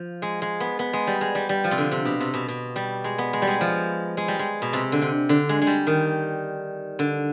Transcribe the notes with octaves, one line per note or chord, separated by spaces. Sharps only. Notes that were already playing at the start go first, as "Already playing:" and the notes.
Already playing: F3
G#3
G#3
B3
B3
G#3
G3
G#3
G3
G3
F3
C3
D3
C3
B2
C3
B2
B2
G3
G#3
B3
G#3
G3
G#3
F3
G#3
G3
G#3
B2
C3
D3
C3
D3
G#3
G#3
G3
D#3
D3